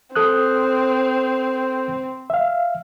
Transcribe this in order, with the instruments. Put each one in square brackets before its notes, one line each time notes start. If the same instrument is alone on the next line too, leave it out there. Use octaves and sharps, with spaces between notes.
[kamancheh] C4 [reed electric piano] A4 D#6 F#6
[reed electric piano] E5 F5